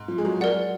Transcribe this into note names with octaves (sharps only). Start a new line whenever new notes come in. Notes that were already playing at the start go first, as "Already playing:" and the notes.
Already playing: G#2
F3
G#3
F#3
F#3 A#4 D5 F#5